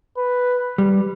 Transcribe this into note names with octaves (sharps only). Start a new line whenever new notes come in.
B4
G3